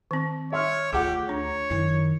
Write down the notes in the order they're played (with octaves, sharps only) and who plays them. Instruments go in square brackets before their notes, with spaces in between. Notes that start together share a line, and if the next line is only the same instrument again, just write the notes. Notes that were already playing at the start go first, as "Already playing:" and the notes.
[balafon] D#3 C4
[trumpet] C#5 [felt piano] E5 C6 F6
[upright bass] D2 [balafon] F4 G#4 [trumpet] G4 [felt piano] F#5 D6
[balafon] D4 [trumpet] C#5 [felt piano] A#5
[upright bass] F#2 D#3 [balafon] E4